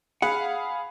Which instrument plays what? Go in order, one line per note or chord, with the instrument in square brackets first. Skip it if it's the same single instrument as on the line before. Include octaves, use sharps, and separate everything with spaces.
[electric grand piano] G#4 F5 B5 [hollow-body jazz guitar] F#5